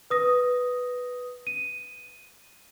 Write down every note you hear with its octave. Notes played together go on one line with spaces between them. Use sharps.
B4 D#6 A#6
D#7